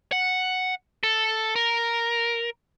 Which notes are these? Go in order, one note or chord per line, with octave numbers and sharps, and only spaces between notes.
F#5
A4
A#4